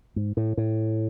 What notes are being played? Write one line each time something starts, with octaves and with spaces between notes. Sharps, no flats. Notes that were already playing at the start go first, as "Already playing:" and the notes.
G#2
A2
A2